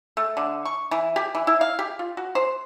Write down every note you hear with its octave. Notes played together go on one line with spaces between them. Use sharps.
A3
D3
C#6
E3
G4
E3
E4
F5
G4
F4
F#4
C5